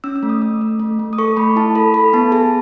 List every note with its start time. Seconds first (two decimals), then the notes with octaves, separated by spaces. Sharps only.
0.04 C#4 E6
0.16 E6
0.23 A3
0.29 D#6
0.42 A3
0.61 A3
0.80 A3
0.99 A3
1.13 D#6
1.18 A4 C#6
1.37 A3 B5
1.56 E4 A5
1.75 A4 B5
1.94 A4 B5
2.13 B3 A5
2.32 G#4 A5